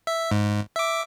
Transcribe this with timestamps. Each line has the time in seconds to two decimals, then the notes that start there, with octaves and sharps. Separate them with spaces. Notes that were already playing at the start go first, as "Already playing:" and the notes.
0.07 E5
0.31 G#2
0.76 E5 D6